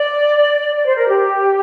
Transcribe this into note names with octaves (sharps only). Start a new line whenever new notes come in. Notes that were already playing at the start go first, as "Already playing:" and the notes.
Already playing: D5
D5
C5
A#4
G4